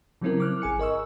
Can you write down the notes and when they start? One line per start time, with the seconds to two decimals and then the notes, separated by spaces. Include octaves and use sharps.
0.21 C#3 F#3 G3 C4 E4 A#4
0.40 D6 F6 F#6
0.62 G#1 G#4 G#5 C#7
0.79 A#4 D#5 C#6 E6